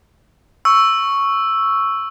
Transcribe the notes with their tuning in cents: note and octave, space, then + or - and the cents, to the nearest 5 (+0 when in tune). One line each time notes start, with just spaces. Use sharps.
C#6 +0 E6 +0